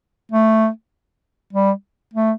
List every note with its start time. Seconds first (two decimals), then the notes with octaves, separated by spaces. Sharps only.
0.32 A3
1.53 G3
2.14 A3